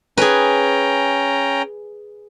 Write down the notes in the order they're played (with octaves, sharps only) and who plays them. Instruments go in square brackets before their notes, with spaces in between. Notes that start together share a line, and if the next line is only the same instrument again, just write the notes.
[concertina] C#4 G5 A#5 [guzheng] G#4 B4